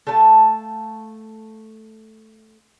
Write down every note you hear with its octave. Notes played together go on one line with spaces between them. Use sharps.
A3 F5 G5 A5